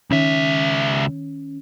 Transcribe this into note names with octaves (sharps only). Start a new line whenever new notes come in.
C#2 D#3 C#4 E5